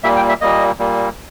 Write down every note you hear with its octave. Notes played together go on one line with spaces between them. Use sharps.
A#2 G3 A#3 E5
G5
E5
A#2 G3 A#3 D#5
A#2 G3 A#3